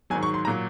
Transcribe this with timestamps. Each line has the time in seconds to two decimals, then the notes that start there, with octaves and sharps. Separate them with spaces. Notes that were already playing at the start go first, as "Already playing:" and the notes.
0.10 G#2 D#3 F#3 G#5
0.23 C#6
0.34 C6
0.45 A#2 F#3 A#5